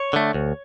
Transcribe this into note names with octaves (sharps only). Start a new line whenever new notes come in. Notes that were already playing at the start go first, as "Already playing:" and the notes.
Already playing: C#5
D3 A3
D2